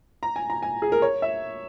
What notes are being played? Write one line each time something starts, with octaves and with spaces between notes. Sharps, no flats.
A#5
G#5
A#5
G#5
G#4
A#4
C#5
E5